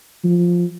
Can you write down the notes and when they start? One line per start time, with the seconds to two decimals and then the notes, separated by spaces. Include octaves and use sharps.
0.24 F3